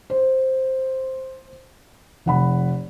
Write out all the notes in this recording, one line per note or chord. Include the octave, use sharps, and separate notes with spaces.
C5
F1 F#5 B5